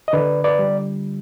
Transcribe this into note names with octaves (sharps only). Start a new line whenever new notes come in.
D#5
D3 B4 D5
B4 D5
G3